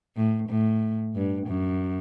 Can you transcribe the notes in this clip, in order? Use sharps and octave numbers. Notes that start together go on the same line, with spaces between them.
A2
A2
G2
F#2